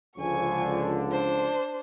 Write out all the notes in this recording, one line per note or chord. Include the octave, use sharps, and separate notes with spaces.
C#2 D3 F3 G#5 C#6
D4 C5